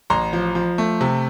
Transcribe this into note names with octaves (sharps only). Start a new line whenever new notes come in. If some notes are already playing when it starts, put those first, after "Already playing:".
A1 A#5 C6
F3
F3
A3
C3